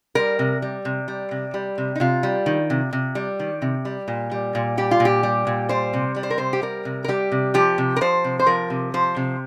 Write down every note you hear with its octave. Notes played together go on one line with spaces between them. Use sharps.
G3 A#4
C3
G3
C3
G3
C3
G3
C3
D#4
C3 F4
G3
D#3
C3
C3
G3
D#3
C3
G3
A#2
G3
A#2
G3 G4
F4
A#2
G4
G3
A#2
G3 C5
C3
G3
C5
A#4
C3 C5
G4
G3 A#4
C3
A#4
G3 G4
C3
F3 G4
C3
A#4
F3 C5
C3
C5
F3 A#4
C3
F3 C5
C3